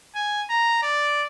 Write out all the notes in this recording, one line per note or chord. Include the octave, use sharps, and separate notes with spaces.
G#5
A#5
D5